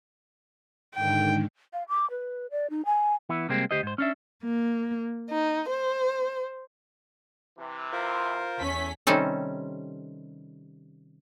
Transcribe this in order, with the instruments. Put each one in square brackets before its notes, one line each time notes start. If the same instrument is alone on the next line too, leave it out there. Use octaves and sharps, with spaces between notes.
[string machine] G#2 D3 D#3 [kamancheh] G5
[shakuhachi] F5
D6
B4
D5
D#4
G#5
[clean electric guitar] E3 B3 E4
C3 G3 G#3 A#3 C4
D2 G4 C5 D#5
G#2 C5
C#4 D4 E5
[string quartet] A#3
D#4
C5
[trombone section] C3 E3
[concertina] F4 A#4 C5
[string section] E2 C#4 B6 [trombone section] A3
[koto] C3 D#3 G3 C4 C#4 A4